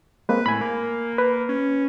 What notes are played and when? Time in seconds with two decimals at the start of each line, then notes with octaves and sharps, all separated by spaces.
0.29 G#3 A#3 C4 B4
0.46 A2 G#5 B5
0.61 A#3
1.18 B4
1.49 C#4